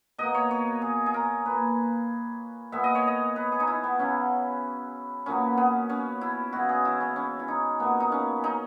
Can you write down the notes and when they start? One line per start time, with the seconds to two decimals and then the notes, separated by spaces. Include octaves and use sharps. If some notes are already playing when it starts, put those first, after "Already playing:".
0.18 B2 A#3 D#5
0.34 C#5
0.51 C#5
0.82 G#4
1.06 G#4
1.14 A#4
1.45 A#2 A#3 B4
2.72 A#2 G#3 B3 E5
2.84 D#5
2.95 C#5
3.07 D#5
3.36 B4
3.52 G#4
3.60 D#4
3.68 E4
3.84 B3
3.99 C#3 F#3 B3 C#4
5.26 A#2 F#3 B3 C#4
5.58 B3
5.89 C#4
6.21 E4
6.53 C#3 E3 G#3 F#4
6.69 G#4
6.85 E4
7.01 C#4
7.16 C#4
7.39 E4
7.48 D#4
7.79 A#2 A#3 B3
8.00 D#4
8.12 C#4
8.44 D#4